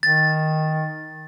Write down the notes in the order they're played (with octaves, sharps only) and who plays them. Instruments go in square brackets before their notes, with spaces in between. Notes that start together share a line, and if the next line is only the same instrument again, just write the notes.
[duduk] D#3 [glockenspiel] A6